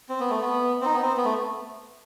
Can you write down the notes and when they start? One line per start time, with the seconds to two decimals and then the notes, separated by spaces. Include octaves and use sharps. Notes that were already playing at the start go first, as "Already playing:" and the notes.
0.09 C4
0.20 B3
0.30 A3
0.41 B3
0.81 C4
0.85 D#4
0.94 B3
1.02 C4
1.17 B3
1.25 A3